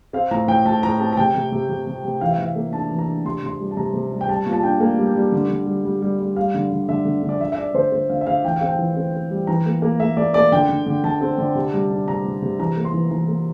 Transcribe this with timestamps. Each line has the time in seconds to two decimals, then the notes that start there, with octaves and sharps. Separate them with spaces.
0.13 C4 F5
0.31 A2 A#5
0.48 A2 G5
0.65 A2 A5
0.83 A2 A#5
1.00 C4 A5
1.13 A5
1.17 C3 G5
1.35 C3
1.52 C3
1.69 C3
1.87 C3
2.05 C3
2.21 E3 F5
2.31 E5
2.39 E3 F5
2.55 A#3
2.73 D4 A5
2.91 E3
2.99 A#5
3.08 D4
3.25 C3 C6
3.43 C3 C6
3.60 G3
3.71 A5
3.77 C3 A#5
3.94 C3
4.12 G3
4.21 G5
4.28 G3 A5
4.46 A#2
4.53 A5
4.63 D4 G5
4.80 A#3
4.98 G3
5.16 G3
5.32 D3
5.49 D3
5.67 G3
5.85 G3
6.02 G3
6.19 G3
6.36 G3 F5
6.54 D3
6.71 D3
6.88 D3 E5
7.05 D3
7.23 D3
7.29 D5
7.40 D3 E5
7.52 E5
7.58 D4 D5
7.74 D3 C5
7.92 D3 C5
8.10 D3 F5
8.21 E5
8.27 D3 F5
8.44 E3 G5
8.56 F5
8.61 C4
8.67 G5
8.79 E3
8.96 C4
9.13 C4
9.31 G3
9.47 E3 A#5
9.66 A#3
9.82 A#3
10.00 A#3 E5
10.17 A#3 D5
10.34 A#3 D5
10.52 D3 G5
10.69 D3
10.86 D3
11.04 D3 A5
11.21 C4
11.38 D3
11.55 C3
11.73 G3
11.90 D4
12.07 C3 A#5
12.25 C3
12.42 C3
12.59 E3 A#5
12.77 A#3
12.85 C6
12.94 E3
13.11 E3 A#5
13.28 A#3